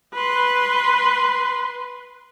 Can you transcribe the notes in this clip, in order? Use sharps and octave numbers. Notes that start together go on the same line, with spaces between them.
B4 C6